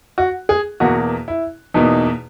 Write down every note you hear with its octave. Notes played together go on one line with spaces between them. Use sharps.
F#4
G#4
E2 B2 A#3 F#4
E4
E2 B2 A#3 D#4